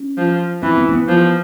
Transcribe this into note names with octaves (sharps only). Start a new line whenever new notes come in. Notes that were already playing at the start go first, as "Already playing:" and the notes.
Already playing: C#4
F3
E3 C4
B3
C4
B3
F3